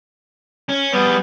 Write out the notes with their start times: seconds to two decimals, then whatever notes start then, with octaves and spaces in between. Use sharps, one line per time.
0.69 C#4
0.93 G3 B3 G#4